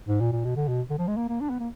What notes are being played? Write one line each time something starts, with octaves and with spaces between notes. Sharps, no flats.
G#2
A#2
A#2
B2
D3
B2
D3
F3
G#3
A#3
A#3
D4
B3
A#3